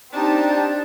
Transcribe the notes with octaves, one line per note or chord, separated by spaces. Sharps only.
C4 D4 D#4 G4 A5